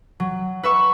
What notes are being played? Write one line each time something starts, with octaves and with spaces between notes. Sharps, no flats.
F#3
B4 E5 C#6